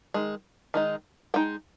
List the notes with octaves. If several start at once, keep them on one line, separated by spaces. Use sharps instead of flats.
D#3 G#3
D#3 G#3 D#4
G#3 D#4 G5